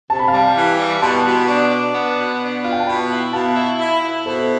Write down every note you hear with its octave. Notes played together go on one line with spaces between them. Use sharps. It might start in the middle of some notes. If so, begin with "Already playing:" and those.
C3 A5
B5
G3 F5 A5
E3
G3
B2 A5 C6
B2
D4
D4
B3
B2
D4
F4 F5
G5
A5
B2 G5 B5
E4
B2 F5 A5
E4
E4
E4
B2 A4 C5